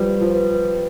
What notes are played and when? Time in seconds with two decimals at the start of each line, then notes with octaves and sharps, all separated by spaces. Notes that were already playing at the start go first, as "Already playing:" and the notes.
Already playing: F3 G3 B4
0.21 F3
0.35 B4